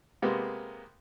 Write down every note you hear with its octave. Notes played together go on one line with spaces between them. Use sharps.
C3 G#3 A#3 B3